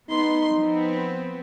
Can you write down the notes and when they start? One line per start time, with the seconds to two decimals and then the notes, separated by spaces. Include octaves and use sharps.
0.10 B3 D#4 C6
0.56 F3 B3 C4